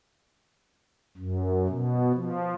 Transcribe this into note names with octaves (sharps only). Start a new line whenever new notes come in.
F#2
B2
F3